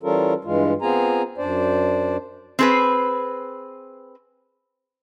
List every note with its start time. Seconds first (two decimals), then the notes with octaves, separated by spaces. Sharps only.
0.03 E3 G3 C#4 F4 A4 A#4
0.45 G2 E3 G#3 F4
0.82 B3 C4 F4 G#4 G#5 A#5
1.38 F#2 D4 C5 D5
2.59 C4 G#4 B4